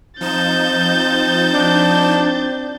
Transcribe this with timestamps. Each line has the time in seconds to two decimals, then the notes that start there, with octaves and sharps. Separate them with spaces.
0.21 F3 C4 D#4 G6 A6 E7
1.53 D4